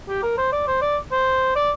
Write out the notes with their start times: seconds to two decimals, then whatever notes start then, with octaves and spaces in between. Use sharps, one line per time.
0.09 G4
0.23 A#4
0.38 C5
0.53 D5
0.67 C5
0.82 D5
1.12 C5
1.56 D5